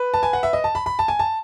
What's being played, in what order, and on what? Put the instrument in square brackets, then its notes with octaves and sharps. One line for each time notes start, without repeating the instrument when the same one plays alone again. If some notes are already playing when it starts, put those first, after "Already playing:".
Already playing: [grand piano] B4
A5
G#5
F#5
E5
D#5
A5
B5
B5
A5
G#5
A5